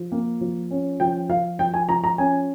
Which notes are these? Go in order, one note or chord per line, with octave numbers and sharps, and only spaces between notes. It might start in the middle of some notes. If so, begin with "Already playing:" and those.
Already playing: F3
A#3
F3
C#4
F3 G5
F3 F5
F3 G5
G#5
F3 A#5
A#5
C#4 G#5